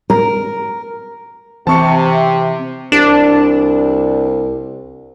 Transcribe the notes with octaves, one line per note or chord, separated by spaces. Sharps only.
A#4
C3 E3 C4 C5 A5 C#6 C#7
C2 D4